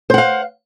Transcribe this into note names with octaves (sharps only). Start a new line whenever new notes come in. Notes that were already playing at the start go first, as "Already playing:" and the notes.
C5 F5 F#5